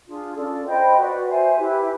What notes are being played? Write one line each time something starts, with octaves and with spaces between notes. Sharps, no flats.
D4 F4 G#4
C#4 F4 A4 D5
C5 D#5 G5 B5
F#4 B4 D5
C5 E5 G#5
E4 G4 B4